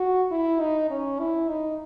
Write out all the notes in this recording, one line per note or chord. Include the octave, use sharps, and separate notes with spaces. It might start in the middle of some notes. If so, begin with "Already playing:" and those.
Already playing: F#4
E4
D#4
C#4
E4
D#4